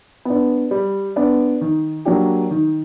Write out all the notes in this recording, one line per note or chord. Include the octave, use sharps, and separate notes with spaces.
B3 D4
G3
B3 D4
D#3
F#3 A#3 D4 G4
D#3